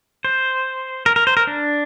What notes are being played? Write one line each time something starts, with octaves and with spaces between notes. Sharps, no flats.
C5
A#4
A#4
C5
A#4
D4